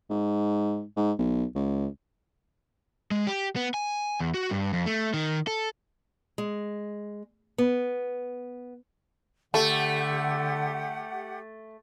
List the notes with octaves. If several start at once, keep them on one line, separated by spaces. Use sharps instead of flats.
G#2
G#2
B1
C#2
G#3
G4
B3
G#5
E2
F#4
G2
F2
A3
D#3
A4
G#3
B3
D3 A3 G4 A4 F#5